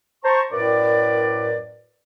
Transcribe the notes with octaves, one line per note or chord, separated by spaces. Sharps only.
C5 A5 A#5 C#6
F#2 A2 A#4 B4 D5